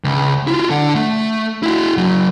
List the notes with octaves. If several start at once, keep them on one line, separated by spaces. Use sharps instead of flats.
C#2
E4 F4
D3 F#5
A3
E4 F#4
F#3 A#3